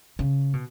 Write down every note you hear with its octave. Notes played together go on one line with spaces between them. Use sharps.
C#3
B2